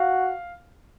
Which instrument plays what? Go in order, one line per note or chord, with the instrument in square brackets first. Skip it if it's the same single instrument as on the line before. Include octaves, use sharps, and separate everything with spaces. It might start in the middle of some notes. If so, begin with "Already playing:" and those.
Already playing: [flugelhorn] F#4 [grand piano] F5